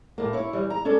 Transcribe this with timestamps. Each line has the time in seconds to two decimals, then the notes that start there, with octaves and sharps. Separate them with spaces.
0.18 A2 A#3
0.33 E4 C#5
0.53 E3 G3
0.70 A#5
0.85 C#4 D4 A4